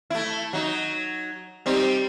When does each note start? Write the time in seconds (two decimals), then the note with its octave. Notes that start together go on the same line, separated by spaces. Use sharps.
0.10 A3 E4
0.53 F#3 D#4
1.66 G3 C4 D#4